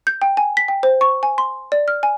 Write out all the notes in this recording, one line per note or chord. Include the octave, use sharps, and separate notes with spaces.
G6
G5
G#5
B6
G5
C5
C#6
G#5
C6
D5
F6
G#5